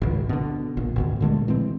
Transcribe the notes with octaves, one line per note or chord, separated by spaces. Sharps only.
G#1 C#2
B2 D3
A#1
G#1 D2 B2
A#2 D3 G#3 A3
E3 G#3 C4